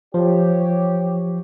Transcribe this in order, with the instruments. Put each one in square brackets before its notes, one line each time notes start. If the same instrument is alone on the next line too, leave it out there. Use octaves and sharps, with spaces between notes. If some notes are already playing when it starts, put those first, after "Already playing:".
[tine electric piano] F3 [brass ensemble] G4 C#5